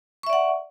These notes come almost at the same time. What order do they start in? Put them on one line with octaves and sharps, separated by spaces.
C#6 E5 D5 F#5